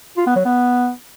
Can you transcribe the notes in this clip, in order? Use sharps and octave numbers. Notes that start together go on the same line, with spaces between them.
F4
B3
F#3
B3